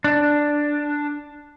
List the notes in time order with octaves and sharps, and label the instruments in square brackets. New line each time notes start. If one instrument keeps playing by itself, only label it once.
[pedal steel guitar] D4